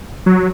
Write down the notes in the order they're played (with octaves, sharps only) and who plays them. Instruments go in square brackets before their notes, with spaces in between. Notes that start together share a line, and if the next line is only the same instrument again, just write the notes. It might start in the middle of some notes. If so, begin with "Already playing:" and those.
[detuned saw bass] F#3